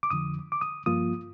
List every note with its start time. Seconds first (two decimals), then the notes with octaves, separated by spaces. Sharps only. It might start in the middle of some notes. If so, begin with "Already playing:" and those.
0.03 D6
0.11 F2 D3 F3 D#6
0.52 D6
0.61 D#6
0.86 G2 F3 A#3 F4 D#6